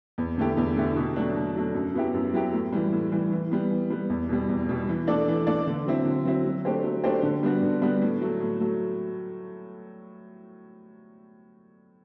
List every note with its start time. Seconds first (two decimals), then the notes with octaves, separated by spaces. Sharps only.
0.18 E2
0.38 D3 A3 E4 G4
0.57 E2
0.76 D3 A3 E4 G4
0.96 B2
1.16 F#3 A3 D4
1.36 B2
1.56 F#3 A3 D4
1.74 F#2
1.94 F#3 B3 E4 G4
2.14 F#2
2.34 F#3 B3 E4 G4
2.53 A2
2.72 E3 G3
2.92 A2
3.12 E3 G3
3.32 E3
3.51 G3 B3
3.71 E3
3.90 G3 B3
4.10 E2
4.29 B2 G3
4.49 E2
4.69 B2 G3
4.89 E3
5.07 A3 D4 A4 D5
5.28 E3
5.47 A3 D4 A4 D5
5.67 D3
5.86 F#3 C4 E4
6.05 D3
6.25 F#3 C4 E4
6.45 F#3
6.65 A3 D4 G4 C5
6.84 F#3
7.04 A3 D4 G4 C5
7.23 D3
7.43 G3 B3 D4 F#4
7.62 D3
7.82 G3 B3 D4 F#4
8.02 A2
8.21 F#3 A3
8.41 A2
8.60 F#3 A3